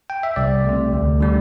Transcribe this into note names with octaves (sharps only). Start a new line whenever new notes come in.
G5
E5
C2 D5
C3 A3
D2
D3 G3